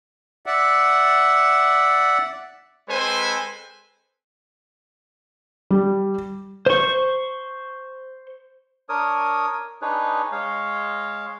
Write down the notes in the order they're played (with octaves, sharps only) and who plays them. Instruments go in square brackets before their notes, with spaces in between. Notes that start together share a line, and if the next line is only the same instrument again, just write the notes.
[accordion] D5 E5 F#5
[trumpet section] G#3 C4 A4 B4 C5 G#5
[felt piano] G3
[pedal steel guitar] C5 C#6
[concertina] D4 A#4 C#5 D#6
D4 D#4 G#4 B4 C#5
G#3 C#5 F5